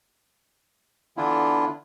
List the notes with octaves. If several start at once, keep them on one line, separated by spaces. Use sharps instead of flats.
D3 E3 B3 D4 E4 F4